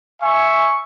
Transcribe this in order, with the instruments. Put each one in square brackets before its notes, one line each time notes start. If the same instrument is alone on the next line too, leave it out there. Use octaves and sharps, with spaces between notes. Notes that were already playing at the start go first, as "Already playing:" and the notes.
[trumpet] E5 [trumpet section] G#5 C#6